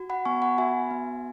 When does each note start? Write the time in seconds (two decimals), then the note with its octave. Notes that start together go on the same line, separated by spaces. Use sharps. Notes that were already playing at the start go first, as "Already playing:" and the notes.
Already playing: F#4
0.10 F#5 B5
0.25 B3 G#5 C#6
0.42 F#5 B5
0.58 F#4 E5 G#5
0.91 B3